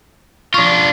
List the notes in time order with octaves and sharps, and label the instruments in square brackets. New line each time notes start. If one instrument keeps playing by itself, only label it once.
[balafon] F3 C#6 [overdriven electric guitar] D4 F4